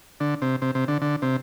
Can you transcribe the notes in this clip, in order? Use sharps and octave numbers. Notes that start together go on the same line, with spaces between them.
D3
C3
C3
C3
D3
D3
C3